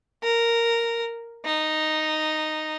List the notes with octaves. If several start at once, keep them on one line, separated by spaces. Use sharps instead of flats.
A#4
D#4